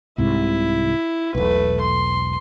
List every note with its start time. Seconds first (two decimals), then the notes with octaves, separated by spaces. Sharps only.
0.18 C2 G#2 C3 E4
1.35 E1 B1 A3 B4
1.80 C6